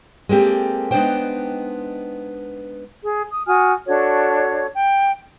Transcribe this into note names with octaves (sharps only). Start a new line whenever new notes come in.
G#3 A#3 C4 G4 A4
G#3 B3 D4 D#4 C5 G5
G#4
D#6
F#4 G#5 D#6 F6
D4 F#4 A4 C#5
G5